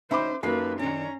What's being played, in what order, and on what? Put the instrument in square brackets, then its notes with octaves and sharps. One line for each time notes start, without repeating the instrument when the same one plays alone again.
[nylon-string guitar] D2 C#4 D#4 [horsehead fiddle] C5 [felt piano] E5 B5 D6
[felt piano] F#2 C7 [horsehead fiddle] A#3 B4 [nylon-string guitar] D#4 G4 A4
[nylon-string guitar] D#3 D4 [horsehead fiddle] C#4 A#5